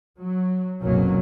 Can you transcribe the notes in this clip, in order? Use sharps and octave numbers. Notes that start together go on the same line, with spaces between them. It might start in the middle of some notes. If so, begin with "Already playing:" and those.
F#3
F#1 C2 B2 F#3 A#3 C#4